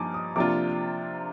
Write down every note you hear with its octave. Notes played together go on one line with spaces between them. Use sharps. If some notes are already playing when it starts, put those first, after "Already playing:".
Already playing: G2 F3 A#3 D#4 G#5 D6
D#6
C3 F3 A#3 D4 F4 D6